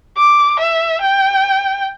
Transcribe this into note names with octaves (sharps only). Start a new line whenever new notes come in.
D6
E5
G5